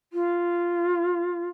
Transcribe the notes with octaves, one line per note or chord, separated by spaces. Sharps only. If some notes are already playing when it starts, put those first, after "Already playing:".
F4